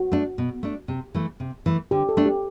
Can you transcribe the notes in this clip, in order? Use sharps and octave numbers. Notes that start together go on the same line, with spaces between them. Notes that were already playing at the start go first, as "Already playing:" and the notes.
Already playing: F#4
A3 D4
B2
A3 D4
C3
E3 A3
C3
E3 A3
D3 G4
A4
A3 D4
G4